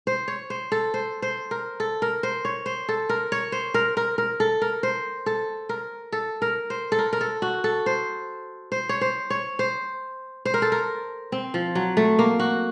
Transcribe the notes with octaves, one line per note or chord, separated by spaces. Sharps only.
C5
C#5
C5
A4
C5
C5
A#4
A4
A#4
C5
C#5
C5
A4
A#4
C#5
C5
A#4
A#4
A#4
A4
A#4
C5
A4
A#4
A4
A#4
C5
A4
A#4
A#4
A4
F#4
A4
C5
C5
C#5
C5
C#5
C5
C5
A#4
A4
A#4
C4
F3
F#3
A3
A#3
F#4